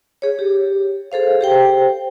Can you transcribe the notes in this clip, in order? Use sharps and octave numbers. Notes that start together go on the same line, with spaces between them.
G#4 C#5
G4
G#4 A4 C5 F5
G4 C5 G5